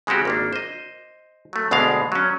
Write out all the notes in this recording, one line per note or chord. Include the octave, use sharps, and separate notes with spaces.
C#3 G#3 C4 F#4 G4
G#1 A#3 D4
C5 D#5
F#3 A3
D2 B2 G#3 D4 F5
F#3 C#4